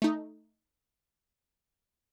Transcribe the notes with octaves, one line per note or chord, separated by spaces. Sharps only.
A3 D#4